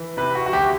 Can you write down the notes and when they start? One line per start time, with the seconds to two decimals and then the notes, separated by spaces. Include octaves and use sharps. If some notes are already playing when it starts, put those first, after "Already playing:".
Already playing: E3
0.17 C3 B4
0.35 F#4
0.46 F#4
0.53 D2 G4